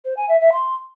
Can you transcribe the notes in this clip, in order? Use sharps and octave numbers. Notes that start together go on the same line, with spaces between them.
C5
G#5
E5
E5
C6